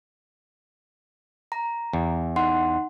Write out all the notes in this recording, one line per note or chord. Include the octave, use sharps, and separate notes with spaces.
A#5
E2
D#4 F#5 C6